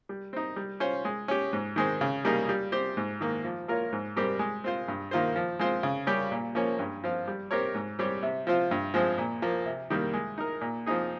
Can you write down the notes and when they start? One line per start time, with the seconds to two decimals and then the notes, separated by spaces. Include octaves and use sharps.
0.09 G3
0.33 C4 D#4
0.56 G3
0.80 C#4 F4 C5
1.05 G#3
1.28 C#4 G4
1.53 G#2
1.76 D#3 G#3 C4
2.01 C#3
2.25 G3 A#3 D#4 G#4
2.49 G3
2.72 C4 G4 C5
2.97 G#2
3.21 D#3 A#3
3.44 F3
3.68 A#3 F4 A#4 C#5
3.93 G#2
4.16 G3 C4 G4 A#4
4.39 G#3
4.64 C4 F4 C5
4.88 G2
5.11 D#3 A#3 F4 C5
5.36 F3
5.59 G#3 C4 F4 C5
5.83 C#3
6.07 G3 C#4 G4
6.32 A#2
6.55 F3 A#3 C#4
6.79 G2
7.04 F3 C4 F4
7.28 G3
7.51 C4 G4 A#4 C#5
7.74 G#2
7.99 G3 C4 G4 C#5
8.23 C3
8.47 F3 C4 F4
8.71 G2
8.94 F3 G#3 C4
9.18 A#2
9.42 F3 A#3
9.66 C3
9.90 D#3 G3 A#3
10.13 G#3
10.38 D#4 A#4
10.61 A#2
10.86 F3 C4 D#4 G#4